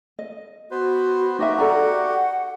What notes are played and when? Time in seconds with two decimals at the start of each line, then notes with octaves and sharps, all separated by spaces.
0.19 D#5
0.71 B3 F#4 B4 C5
1.39 D#4 F#4 G4 D#5 E5
1.58 A4 D5 F#5 A#5